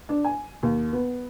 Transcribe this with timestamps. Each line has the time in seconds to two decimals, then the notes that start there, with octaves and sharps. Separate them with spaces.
0.09 D4
0.24 G#5
0.63 D#2
0.93 B3